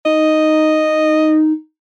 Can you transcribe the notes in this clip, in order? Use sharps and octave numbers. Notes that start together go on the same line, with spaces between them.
D#4 D#5